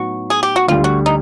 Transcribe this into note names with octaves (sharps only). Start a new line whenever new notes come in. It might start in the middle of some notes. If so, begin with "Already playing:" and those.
Already playing: A2 F#3 B3 D#4 F#4
G#4
G4
F#4
D2 D3 G3 F4
F#4
D#4